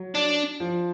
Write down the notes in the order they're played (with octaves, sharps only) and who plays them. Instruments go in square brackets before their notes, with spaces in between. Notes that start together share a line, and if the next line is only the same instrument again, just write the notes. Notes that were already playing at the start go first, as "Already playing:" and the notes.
Already playing: [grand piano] F#3
[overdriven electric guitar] D4
[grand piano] F3